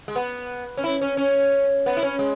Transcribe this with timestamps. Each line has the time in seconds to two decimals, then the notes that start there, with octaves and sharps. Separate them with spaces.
0.08 G#3
0.16 B3
0.77 C#4
0.84 E4
1.01 C#4
1.17 C#4
1.86 B3
1.97 E4
2.03 C#4
2.19 G#3